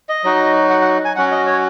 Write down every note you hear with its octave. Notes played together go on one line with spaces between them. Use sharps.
D#5
F#3 D#4 F#4
F#5
F#5
G#5
F#3 C#4 F#4 F#5
D#5
C#5